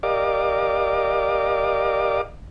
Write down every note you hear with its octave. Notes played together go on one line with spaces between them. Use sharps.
G4 A#4 D5 D#5 F5 D6